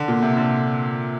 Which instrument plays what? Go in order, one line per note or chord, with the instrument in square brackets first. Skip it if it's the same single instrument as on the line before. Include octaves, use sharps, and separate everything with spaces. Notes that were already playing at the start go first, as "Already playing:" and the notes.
Already playing: [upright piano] D3
A#2
C3
D3